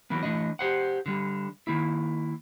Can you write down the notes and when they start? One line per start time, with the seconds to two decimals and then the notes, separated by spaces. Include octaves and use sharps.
0.10 E3 F#3 A#3 B3
0.23 E3 A3 D4 D#5
0.59 G4 C5 F#5
1.06 D3 G3
1.67 D#3 A#3 E4